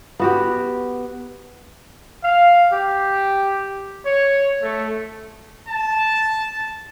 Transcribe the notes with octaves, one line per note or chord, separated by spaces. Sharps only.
B3 F#4 G4
F5
G4
C#5
A3
A5